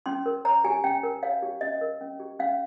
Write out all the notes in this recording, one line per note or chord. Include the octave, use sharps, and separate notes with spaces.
C#4 C6
A#4
C#5 A#5
G4 G#5
C#4 G5
A#4
C#5 F5
G4
C#4 D#5
A#4
C#4
G4
C#4 F5